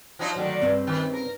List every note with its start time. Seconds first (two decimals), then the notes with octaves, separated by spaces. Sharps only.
0.19 F3 F#3 D#4
0.36 D3 D#3 F#3 A3 D4
0.62 G2 C#3 C4
0.87 D#3
1.14 A#4